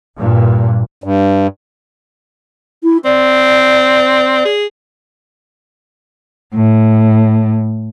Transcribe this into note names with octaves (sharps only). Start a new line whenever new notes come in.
G2 A#2
G2
E4
C4 D5
G#4
A2